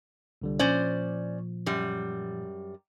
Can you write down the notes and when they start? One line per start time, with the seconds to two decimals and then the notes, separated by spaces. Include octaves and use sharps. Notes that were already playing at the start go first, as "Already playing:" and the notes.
0.42 C2 D3 G3
0.59 A#2 F3 C#4 C5 D5
1.66 F#2 G3